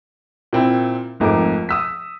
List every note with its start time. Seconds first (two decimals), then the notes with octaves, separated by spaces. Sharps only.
0.53 A#2 C4 E4
1.20 G#1 F2 G#2 A3 A#5 D6
1.69 D#6 E6 B6